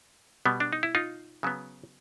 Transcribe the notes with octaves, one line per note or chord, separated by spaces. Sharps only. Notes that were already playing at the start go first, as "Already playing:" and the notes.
B2 G3 B3
D4
D#4
E4
D#4 F4
C#3 F#3 B3